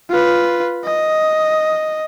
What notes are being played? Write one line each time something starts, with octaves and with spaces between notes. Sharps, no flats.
F4 B4
D#5